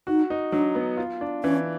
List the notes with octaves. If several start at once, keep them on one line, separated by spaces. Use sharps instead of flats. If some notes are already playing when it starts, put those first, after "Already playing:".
D#4 F#4
D#4
F#3 D4
B3
F4
D4
E3 C#4